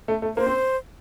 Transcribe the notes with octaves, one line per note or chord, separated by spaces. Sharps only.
A3
A3
A#3 C5
C4